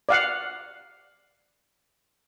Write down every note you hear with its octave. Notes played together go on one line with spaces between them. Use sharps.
D5 F5 F#5